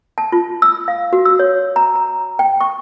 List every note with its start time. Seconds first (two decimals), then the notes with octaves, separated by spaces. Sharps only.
0.18 A5
0.32 F4
0.62 E6
0.88 F5
1.13 F#4
1.25 E6
1.39 C#5
1.76 A#5
1.95 A#5
2.39 G5
2.61 C#6